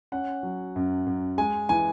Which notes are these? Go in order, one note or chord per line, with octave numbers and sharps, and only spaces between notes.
C#4 F#5
F#3
F#2
F#2
G#3 G#5
E3 G#5